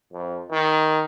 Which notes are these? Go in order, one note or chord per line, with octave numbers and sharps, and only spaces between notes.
F2
D#3